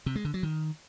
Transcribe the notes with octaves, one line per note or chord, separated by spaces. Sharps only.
C3
G#3
D3
F#3
D#3